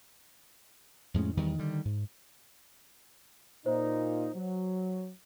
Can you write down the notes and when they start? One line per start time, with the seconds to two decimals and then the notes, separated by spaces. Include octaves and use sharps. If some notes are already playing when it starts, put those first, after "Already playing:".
1.14 F2 A2 G#3 C#4
1.37 E2 D#3 G3
1.59 D3 D#3 G3
1.85 G#2
3.66 A#2 D#4 C5
4.35 F#3